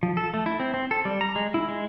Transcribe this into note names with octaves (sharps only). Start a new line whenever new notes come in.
F3
A4
A3
E4
C4
C4
A4
G3
A#5
G#3
E4
G#3